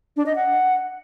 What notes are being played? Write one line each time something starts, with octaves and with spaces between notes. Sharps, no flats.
D4
D#5
F#5